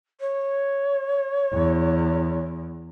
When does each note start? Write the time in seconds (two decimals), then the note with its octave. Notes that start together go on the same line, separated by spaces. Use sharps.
0.20 C#5
1.53 E2